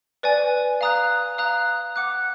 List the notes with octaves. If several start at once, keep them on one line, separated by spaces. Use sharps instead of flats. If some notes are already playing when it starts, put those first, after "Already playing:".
B4 D5 G#5
F5 A#5 D#6 F#6
F5 A#5 D#6 F#6
F#5 D6 F#6